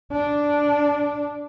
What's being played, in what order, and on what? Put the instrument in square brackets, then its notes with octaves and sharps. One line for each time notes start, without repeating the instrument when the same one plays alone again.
[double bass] D4